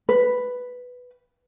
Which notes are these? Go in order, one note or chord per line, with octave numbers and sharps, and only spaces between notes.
B4